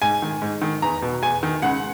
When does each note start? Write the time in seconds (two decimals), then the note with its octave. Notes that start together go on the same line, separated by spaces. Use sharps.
0.02 G#2 G#5
0.22 D#3
0.42 G#2
0.61 D#3
0.82 E2 A#5
1.02 B2
1.22 E2 G#5
1.43 D#3
1.62 C#2 F#5